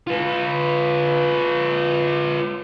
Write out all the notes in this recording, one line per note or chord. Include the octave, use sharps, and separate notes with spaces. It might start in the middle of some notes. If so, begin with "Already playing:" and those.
F4 B4